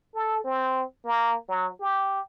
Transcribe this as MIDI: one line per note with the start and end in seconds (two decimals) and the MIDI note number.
0.14 0.41 69
0.44 0.83 60
1.05 1.35 58
1.49 1.69 54
1.80 2.20 67